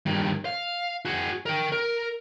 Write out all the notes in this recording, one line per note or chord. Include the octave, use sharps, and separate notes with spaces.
G2 D#3
F5
F#4 G#4
A#4 G5
A#4